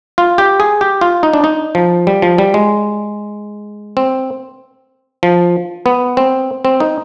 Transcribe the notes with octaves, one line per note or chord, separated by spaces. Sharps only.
F4
G4
G#4
G4
F4
D#4
D4
D#4
F3
G3
F3
G3
G#3
C4
F3
B3
C4
C4
D#4